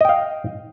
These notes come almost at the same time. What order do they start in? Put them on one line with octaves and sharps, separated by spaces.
D#5 G5 F5